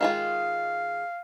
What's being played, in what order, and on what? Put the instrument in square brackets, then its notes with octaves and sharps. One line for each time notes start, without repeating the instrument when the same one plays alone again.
[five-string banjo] D#3 G#3 F4 [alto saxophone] F5